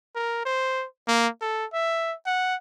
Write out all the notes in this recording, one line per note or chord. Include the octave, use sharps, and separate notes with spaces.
A#4
C5
A#3
A4
E5
F#5